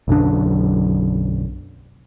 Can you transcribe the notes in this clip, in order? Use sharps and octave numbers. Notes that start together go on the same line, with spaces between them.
B1 F#2 D3 D4